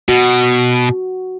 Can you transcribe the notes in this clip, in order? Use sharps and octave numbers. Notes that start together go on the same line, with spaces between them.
B2 F#4